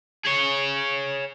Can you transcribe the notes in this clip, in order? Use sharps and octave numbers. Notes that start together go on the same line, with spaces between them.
G#4 C#5